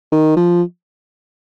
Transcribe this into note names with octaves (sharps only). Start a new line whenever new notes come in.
D#3
F3